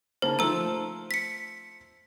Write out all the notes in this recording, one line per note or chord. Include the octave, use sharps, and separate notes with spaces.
C#3 A#3 C5 A5
F3 A3 A4 A#5 E6
B6 C#7